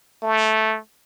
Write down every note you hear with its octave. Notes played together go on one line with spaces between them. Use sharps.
A3